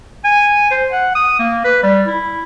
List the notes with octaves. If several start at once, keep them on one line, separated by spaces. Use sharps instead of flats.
G#5
C5
F#5
D#6
A#3
B4
G3
E4